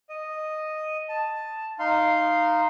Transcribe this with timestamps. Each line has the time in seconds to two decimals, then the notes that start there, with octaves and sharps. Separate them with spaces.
0.10 D#5
1.09 A5
1.79 D#4 F5 C6